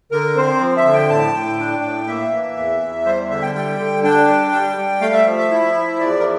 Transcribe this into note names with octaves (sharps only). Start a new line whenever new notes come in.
D3 A#4
C4 C5
F3
E5
D3
G5
A2 A5
A2 G5
D4
A2
A#3 E5
E3
E2
E2
G3 C5
D3 E5
G5
G3 G5
D3
D4 G5
G3
G3
G3
A3 F5
E5
F3
E5
E4
F3
E2 D5
A#4